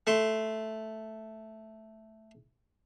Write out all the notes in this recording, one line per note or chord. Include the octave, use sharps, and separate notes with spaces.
A3 C6